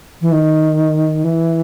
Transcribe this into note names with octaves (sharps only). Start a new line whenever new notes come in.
E3
D#3
E3